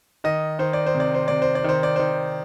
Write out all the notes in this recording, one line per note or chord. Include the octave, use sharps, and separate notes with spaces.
D#3 D#5
D#3 C5
D5
C5
C3
D5
C5
C3 D5
C5
D5
D#3 C5
D5
D#3 C5